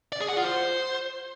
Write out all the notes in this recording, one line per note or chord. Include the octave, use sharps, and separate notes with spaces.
D5
G#4
F#5
F4
C5